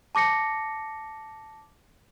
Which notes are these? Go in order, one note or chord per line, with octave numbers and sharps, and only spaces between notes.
A5 D6 A#6 C#7